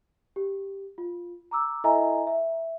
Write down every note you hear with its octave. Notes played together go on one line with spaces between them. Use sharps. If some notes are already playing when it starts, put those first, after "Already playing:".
G4
F4
A#5 D6 E6
E4 A4 D#5 E5 G#5 A#5
E5